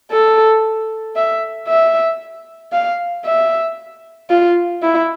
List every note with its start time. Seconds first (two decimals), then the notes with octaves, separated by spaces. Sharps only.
0.11 A4
1.16 E5
1.68 E5
2.72 F5
3.25 E5
4.30 F4
4.83 E4